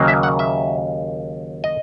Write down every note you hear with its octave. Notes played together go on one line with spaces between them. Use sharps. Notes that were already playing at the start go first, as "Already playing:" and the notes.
Already playing: D#2 C#3 F#3 A#3
E5
F#5
E5
D#5